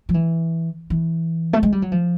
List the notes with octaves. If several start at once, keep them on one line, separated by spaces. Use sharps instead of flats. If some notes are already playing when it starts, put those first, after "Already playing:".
F3
E3
E3
A3
G#3
G3
F#3
F3